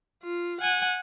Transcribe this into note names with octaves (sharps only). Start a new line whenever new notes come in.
F4
F#5 G#5